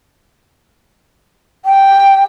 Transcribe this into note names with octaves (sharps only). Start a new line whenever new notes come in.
G5